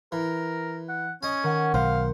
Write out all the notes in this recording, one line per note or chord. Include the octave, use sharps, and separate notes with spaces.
E3 A#4
F#5
C#4 D#5 G#5
D#3 F#5
B1 C5 F5